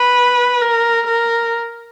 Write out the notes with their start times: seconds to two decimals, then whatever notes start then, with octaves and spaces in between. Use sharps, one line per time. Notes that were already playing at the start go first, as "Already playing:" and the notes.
Already playing: B4
0.61 A#4
1.07 A#4